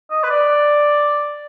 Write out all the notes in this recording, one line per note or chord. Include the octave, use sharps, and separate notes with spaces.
D#5
B4
D5